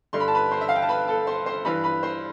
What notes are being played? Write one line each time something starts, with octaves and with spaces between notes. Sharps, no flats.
G2 D3 C6
B5
A5
B4 B5
C5 C6
E5
F5
G5
A5
B4 B5
A4 A5
C5 C6
C5 C6
G2 E3 B4 B5
B4 B5
C5 C6